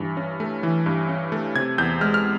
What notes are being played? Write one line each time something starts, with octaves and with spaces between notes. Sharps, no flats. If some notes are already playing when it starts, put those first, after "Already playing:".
Already playing: G2 E3
C#4
A3
E3
G2
C#4
A3
C3 G#6
E2 G6
G#3 F6
F6